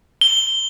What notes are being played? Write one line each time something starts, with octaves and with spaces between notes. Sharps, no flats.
G7